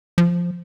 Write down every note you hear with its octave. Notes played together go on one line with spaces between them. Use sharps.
F3